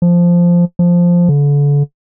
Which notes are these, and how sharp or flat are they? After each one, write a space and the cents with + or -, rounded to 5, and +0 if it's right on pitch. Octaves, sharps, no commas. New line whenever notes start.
F3 -5
F3 +0
D3 -35